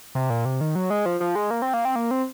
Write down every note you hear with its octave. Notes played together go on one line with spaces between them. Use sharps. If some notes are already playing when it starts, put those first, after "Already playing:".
C3
A#2
C3
D#3
F#3
G#3
F3
F3
G#3
A#3
C4
A#3
C4
A#3
C4